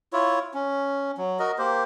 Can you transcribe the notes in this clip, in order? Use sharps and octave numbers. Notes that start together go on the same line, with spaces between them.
E4 F4 C#5
C#4
F#3
F#4 A#4 D#5
A#3 G4 C5